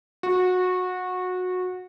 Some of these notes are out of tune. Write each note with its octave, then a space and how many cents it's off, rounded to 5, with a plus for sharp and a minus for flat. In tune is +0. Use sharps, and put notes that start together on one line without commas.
F#4 -20